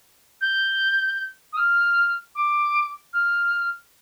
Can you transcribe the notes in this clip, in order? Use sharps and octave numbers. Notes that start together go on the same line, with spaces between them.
G6
D#6
F6
D6
F6